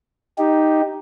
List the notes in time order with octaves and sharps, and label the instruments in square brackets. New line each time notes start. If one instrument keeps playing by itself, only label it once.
[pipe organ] D#4 G4